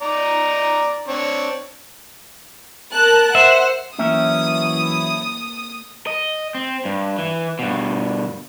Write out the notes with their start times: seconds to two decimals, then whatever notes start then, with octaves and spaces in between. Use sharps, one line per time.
0.02 D#4 D5 A#5
1.08 C4 D4 C#5
2.93 A#4 A5 F#6
3.35 C5 E5 F#5
3.99 E3 F#3 A#3 C#4 E4 E5 G5 D#6
6.07 D#5
6.55 C4
6.85 G2
7.18 E3
7.59 G2 B2